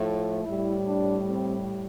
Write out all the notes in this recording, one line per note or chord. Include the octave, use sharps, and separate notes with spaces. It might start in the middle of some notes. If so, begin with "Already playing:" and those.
Already playing: A2 F3 A3
A2 G3 E4
D4
C4